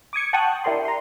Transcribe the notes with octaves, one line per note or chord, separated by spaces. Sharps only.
D6 D#6 G#6 C#7
F#5 G5 A5 C#6 D#6 F#6
D4 E4 G4 A#4 D5 C6
A#5 C6